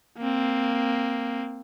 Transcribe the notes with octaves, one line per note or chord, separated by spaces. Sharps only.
A#3 C4